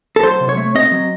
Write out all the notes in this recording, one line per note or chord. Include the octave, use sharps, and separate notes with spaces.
A4
F#3 C5
C3
C#5
A3
C4 D#5
F#3